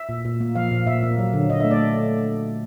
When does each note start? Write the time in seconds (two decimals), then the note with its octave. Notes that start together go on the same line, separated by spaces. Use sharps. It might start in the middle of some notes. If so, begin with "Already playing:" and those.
Already playing: E5
0.09 A#2
0.25 A#2
0.40 A#3
0.55 F3 F5
0.71 A#2
0.87 A#2 E5
1.03 A#3
1.18 F#3
1.34 D3
1.50 D3 D#5
1.60 A3 E5
1.71 D5